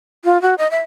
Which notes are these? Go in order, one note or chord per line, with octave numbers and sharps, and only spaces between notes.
F4
F#4
D#5
E5